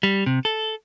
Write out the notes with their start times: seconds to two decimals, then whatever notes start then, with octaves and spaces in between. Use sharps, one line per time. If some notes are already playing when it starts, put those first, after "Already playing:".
0.03 G3
0.26 C3
0.45 A4